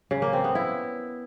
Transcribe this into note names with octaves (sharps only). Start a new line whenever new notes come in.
C#3
A#3
C4
B3
E4